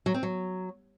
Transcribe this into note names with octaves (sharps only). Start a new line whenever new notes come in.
F#3
C4
F#3